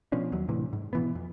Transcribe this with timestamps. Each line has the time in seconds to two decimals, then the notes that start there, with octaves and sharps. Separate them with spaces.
0.12 B2 F3 C#4 D4
0.32 D#2 F#3
0.49 A2 C3 E3
0.73 G#2
0.93 B2 E3 B3
1.15 F2